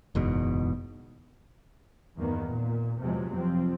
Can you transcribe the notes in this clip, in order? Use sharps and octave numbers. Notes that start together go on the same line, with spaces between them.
F#1 E2 G#2 B2
E2 G2 D#3 A#3 B3
A#2
E2 C3 F3 F#3 G#3
F2 F3 C4